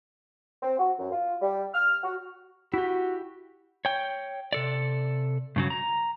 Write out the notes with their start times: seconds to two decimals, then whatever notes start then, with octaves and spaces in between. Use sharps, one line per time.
0.63 C4
0.79 F#4
0.99 F#2
1.12 F4
1.41 G3
1.74 F6
2.03 F#4
2.74 E4 F#4 G4
3.85 C#5 G5
4.53 C3 A4 D5
5.56 G2 C#3 F#3
5.70 A#5